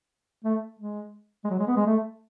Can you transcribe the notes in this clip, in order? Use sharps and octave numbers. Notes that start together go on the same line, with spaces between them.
A3
G#3
G#3
F#3
G#3
B3
G#3
A3